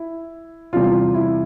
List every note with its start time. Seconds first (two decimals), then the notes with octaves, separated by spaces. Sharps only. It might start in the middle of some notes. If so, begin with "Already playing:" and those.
Already playing: E4
0.73 E2 C3 G3 F4
1.14 E4